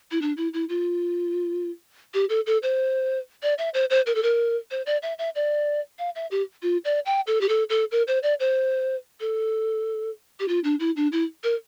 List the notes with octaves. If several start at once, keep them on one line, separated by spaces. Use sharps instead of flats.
E4
D4
E4
E4
F4
G4
A4
A4
C5
D5
E5
C5
C5
A#4
A4
A#4
C5
D5
E5
E5
D5
F5
E5
G4
F4
D5
G5
A4
G4
A4
A4
A#4
C5
D5
C5
A4
G4
F4
D4
E4
D4
E4
A#4